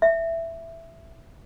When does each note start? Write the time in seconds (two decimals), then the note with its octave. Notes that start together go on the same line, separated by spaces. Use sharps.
0.02 E5